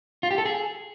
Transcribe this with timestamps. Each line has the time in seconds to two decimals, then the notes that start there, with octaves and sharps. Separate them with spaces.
0.23 F4
0.31 G4
0.38 A4
0.45 G#4